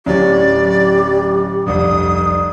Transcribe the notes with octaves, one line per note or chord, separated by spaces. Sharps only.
D1 F#3 C#4 G4 D5
F1 C2 G2 D#6